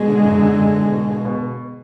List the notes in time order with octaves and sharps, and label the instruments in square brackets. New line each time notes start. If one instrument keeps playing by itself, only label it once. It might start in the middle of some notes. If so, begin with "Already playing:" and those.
Already playing: [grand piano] B2 [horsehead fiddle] G#3
[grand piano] D3
F#2
D3
D3
B2
B2
B2
B2